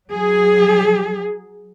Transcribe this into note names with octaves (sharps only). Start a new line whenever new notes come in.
F#3 G#4